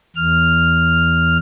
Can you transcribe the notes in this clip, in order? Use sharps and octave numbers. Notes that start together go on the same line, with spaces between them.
E2 F6